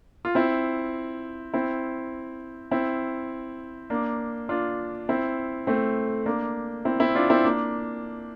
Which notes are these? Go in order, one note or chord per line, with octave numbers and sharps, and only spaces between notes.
F4
C4 E4
C4 E4
C4 E4
A#3 D4
D4 F4
C4 E4
A3 C4
A#3 D4
C4 E4
C4 E4
D4 F4
C4 E4
A#3 D4